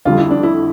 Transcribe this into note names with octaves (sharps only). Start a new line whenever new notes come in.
F2 D3 G3 F4
E4
D4
E4